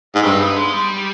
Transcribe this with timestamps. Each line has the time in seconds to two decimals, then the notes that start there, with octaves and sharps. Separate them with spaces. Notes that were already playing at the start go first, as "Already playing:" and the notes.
0.15 G#2
0.23 G2 C4
0.40 B3
0.57 G#3
0.73 G3